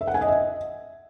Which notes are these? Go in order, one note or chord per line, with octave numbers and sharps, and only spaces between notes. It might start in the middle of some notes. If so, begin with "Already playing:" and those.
E5
F#5
G#5
D#5
E5